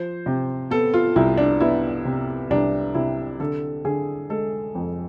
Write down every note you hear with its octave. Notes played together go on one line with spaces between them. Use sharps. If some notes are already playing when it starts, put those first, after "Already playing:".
Already playing: F3 C5
C3
B3 A4
F4
C2 E4
D4
B3 E4
C3
C2 D4
C3 E4
D3 A4
D3 G#4
G#3 A4
F2